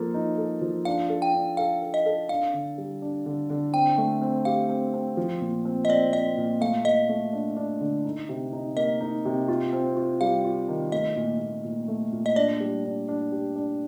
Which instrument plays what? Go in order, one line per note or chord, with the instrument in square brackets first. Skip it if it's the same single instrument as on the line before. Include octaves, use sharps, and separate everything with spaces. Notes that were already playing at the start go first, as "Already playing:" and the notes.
Already playing: [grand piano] F3 A#3 A4
D#4
A4
F3
[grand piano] D4 [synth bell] F5
[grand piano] A4
[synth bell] G5
[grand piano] D4
[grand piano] A4 [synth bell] F5
[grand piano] A4
[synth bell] D#5
[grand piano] A4
[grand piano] D4 [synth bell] F5
[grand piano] D3
G3
D4
D3
D3
[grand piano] C4 [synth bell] G5
[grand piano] A3
C4
[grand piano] G4 [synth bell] F5
[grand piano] C4
C4
F3
A#2
C4
[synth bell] D#5
[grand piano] C4 [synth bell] D5
[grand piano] C4 [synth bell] D#5
[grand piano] A#2
[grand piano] A3 [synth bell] F5
[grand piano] A3 [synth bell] D#5
[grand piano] A3
D4
D4
D3
D#4
C3
D#4
[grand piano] A#3 [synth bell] D#5
[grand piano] D#4
C3
F4
C4
F4
[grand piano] G3 [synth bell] F5
[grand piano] F4
D#3
[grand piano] A3 [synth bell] D#5
[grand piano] A#2
A#2
A#2
A3
A#2
[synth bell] D#5
[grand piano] D4 [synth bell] D5
[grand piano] G3
D4
D4
G4
D4